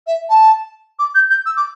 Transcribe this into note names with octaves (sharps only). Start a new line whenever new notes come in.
E5
A5
D6
G6
G6
E6
D6